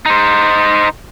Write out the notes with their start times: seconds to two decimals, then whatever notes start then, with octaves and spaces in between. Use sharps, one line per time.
0.06 D#4 C5